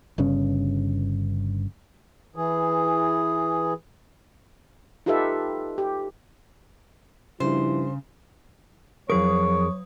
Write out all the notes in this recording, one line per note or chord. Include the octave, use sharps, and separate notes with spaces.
G1 G2 C#3 C#4
E3 G#4
D#4 F4 G4 A4 B4 E5
G4
G2 C#3 F3 E4 C5
F2 F#3 G#4 A#4 C#5 D#6